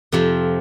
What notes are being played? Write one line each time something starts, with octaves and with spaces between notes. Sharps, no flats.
F2 C3 F3